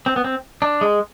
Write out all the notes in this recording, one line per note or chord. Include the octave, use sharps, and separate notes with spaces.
C4
B3
C4
D4
G#3